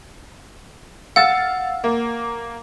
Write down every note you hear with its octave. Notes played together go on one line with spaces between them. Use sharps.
F5 F#5 E6 A6
A#3